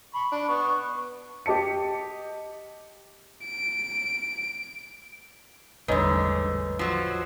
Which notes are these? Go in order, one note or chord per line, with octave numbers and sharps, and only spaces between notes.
B5 C#6
D4
B3 C#6
G4 D#5 A5 C#7
D7
A1 E2 G#2 D3 G3 B4 C#5 D#5
F3 F#3